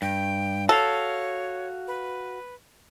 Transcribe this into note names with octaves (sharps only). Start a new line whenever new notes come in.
G2 G5
F#4 A4 C#5 F5
B4